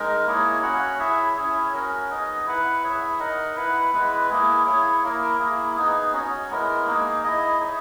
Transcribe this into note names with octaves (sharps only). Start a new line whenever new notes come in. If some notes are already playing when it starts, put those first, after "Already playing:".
Already playing: G#3 D#4 A#4
A#3 E4 G#4 C#5
C#4 F#4 C#5 F#5
E4 G#4 C#5 E5
C#4 E4 G#4 C#5
C#4 F#4 A#4
B3 D#4 G#4 D#5
E4 B4 F#5
E4 G#4 C#5 E5
D#4 A#4 D#5 F#5
E4 B4 F#5
G#3 B3 E4 B4
A#3 E4 G#4
E4 G#4 C#5
A#3 E4 A#4
A#3 E4 G#4
B3 D#4 G#4
C#4 F#4 C#5
G#3 B3 E4 A#4
A#3 D#4 G#4
E4 G#4 D#5
D#4 G#4 C#5 E5